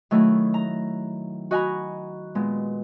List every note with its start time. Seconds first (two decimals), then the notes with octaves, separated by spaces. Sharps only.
0.11 D#3 F#3 A3 D#4 E4
0.54 A#5
1.51 F#4 D#5 F#5 G#5 A#5 B5
2.35 A#2 G#3 B3